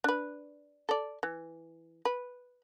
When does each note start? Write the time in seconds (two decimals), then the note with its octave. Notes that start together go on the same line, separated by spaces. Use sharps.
0.04 D4 B4
0.89 A4 D5
1.23 E3
2.05 B4